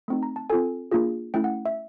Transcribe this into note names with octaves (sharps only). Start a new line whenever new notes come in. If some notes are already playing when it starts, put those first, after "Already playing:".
A3 C4 D#4
A#5
A5
C4 F4 A4 G#5
A#3 D4 F4 G#4
A3 C#4 E4 G5
F#5
E5